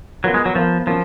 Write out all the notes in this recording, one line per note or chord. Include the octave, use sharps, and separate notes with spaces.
F#3 B3 F4 A#4
G#3
F#3
F3 B3 F4 A#4
F3 F#3 A#3 C#4